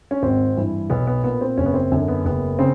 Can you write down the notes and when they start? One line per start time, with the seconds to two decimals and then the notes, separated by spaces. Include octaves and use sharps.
0.11 C#4
0.23 G#1 C4
0.56 G2 E3
0.90 B1 B3
1.07 B3
1.24 A#2 B3
1.41 C4
1.58 F#1 C#4
1.66 B3
1.74 C4
1.92 F#2 D3
2.08 B3
2.25 F#1 B3
2.59 C#3 C4